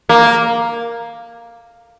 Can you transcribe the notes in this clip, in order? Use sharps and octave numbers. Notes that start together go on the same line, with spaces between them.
A#3